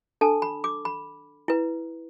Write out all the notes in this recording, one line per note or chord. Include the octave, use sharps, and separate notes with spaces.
D4 A4 A5
B5
D6
B5
E4 B4